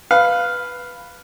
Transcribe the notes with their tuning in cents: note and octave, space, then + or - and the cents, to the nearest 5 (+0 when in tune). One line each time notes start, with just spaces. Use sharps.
B4 +0 F5 +0